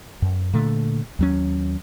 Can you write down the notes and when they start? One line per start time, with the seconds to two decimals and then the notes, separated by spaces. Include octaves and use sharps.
0.22 F#2
0.54 A#2 D3 A3
1.19 D#2 F#3 C#4